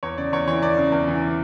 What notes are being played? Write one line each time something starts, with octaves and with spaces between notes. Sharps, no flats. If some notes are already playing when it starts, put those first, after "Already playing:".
E2 C#5
C#3 D5
E2 C#5
E3 C#5
E2 D5
C#3
E2
E3